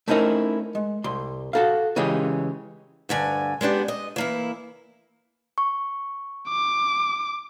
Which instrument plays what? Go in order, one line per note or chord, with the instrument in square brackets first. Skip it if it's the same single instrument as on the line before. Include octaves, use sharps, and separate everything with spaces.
[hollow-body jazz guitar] A3 C4 C#4 D#4 E4 A#4
G#3
C2 C6
F#4 A4 F5
C#3 E3 G#3 C#4 G4 G#4
[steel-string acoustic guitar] D2 G2 D3 G#5
G#3 B3 D4 G4
D#5
E3 A#3 E4
[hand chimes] C#6
[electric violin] D6